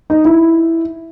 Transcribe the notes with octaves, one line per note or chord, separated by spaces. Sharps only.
D#4
E4